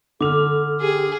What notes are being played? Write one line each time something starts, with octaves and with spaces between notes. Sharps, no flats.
D3 A4 D6 E6 F6 F7
G4 G#4